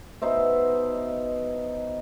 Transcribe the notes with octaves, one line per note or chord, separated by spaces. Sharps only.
B2 D#4 C5 E5